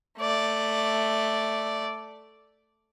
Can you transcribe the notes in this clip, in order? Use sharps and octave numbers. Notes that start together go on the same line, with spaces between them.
A3 D5